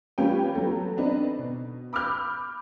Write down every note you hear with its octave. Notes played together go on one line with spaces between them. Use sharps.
G3 A#3 C#4 F4 B4 G5
F#3 A4
B3 C4 D4 D#4 B4
B2
B5 D6 E6 F6 G6